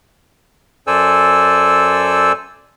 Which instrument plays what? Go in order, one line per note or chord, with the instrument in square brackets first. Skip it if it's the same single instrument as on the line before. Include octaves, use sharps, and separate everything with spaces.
[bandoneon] F#2 A4 C5 D5 G#5 E6